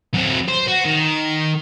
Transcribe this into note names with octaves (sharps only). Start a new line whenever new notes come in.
F#3 C4
C5
F#4
D#3